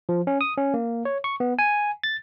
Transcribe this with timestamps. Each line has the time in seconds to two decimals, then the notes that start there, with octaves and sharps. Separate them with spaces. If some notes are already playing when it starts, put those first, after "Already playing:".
0.09 F3
0.27 C#4
0.41 D#6
0.57 C#4
0.74 A#3
1.05 C#5
1.24 C#6
1.40 B3
1.59 G#5
2.04 A6